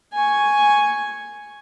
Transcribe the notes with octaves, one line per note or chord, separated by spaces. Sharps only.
G#5 C#6